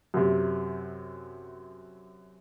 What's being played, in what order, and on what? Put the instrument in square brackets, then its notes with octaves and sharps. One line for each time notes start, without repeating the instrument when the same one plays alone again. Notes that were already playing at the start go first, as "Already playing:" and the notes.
[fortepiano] F#2 C3